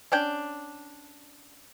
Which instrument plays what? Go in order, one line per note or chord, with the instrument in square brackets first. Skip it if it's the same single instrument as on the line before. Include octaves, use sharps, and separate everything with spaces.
[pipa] C#4 D4 G5